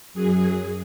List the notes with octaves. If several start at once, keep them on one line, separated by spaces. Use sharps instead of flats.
F#2 F#3 G#4